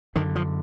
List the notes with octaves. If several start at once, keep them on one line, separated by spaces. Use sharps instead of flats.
F#2 D3 D#3
F3